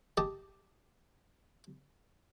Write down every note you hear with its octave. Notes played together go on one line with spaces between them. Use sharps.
G4 D#5 A5